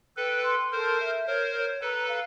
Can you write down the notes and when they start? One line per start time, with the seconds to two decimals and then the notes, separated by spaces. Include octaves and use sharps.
0.17 A4 B4 G5
0.44 C6
0.72 A4 A#4 C5
1.00 E5
1.26 A#4 C5 C#5
1.54 C#5
1.81 A4 B4 A#5
2.08 F5